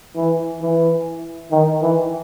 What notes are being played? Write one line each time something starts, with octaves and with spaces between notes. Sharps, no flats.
E3
E3
D#3
E3